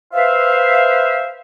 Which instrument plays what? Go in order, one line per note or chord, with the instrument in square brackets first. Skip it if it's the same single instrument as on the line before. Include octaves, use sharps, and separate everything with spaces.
[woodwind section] B4 C5 E5 F5